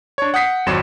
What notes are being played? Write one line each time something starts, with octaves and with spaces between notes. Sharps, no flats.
D4 C#5
F#5 D#6 G6 B6 C7
G#1 F2 F#3 C6 E7